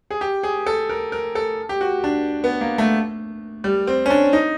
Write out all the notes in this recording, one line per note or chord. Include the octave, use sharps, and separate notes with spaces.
G#4
G4
G#4
A4
A#4
A#4
A4
G4
F#4
D4
B3
A#3
A3
G3
C4
C#4
D4
D#4